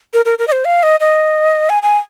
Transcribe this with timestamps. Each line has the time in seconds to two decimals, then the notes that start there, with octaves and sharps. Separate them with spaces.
0.14 A#4
0.25 A#4
0.39 A#4
0.47 D#5
0.52 C5
0.65 F5
0.83 D#5
1.00 D#5
1.70 G#5
1.83 G#5